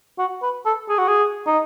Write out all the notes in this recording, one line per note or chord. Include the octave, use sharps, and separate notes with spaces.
F#4
B4
A4
G#4
F#4
G#4
D#4